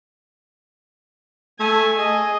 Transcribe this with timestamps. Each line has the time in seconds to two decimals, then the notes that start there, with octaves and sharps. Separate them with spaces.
1.60 A3 G#5
1.98 G#4 D#5